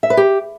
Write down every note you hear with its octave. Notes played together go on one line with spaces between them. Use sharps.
E5
B4
G4